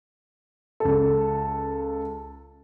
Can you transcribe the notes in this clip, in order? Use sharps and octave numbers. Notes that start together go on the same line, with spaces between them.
C#2 A4